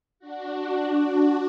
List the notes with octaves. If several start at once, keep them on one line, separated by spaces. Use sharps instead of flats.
D4 F#4